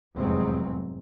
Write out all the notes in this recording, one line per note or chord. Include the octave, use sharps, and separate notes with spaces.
F1 E2 G#2 F#3 C4